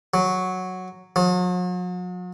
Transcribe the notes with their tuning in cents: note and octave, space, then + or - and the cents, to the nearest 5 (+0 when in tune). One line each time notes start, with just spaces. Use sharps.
F#3 -5
F#3 -45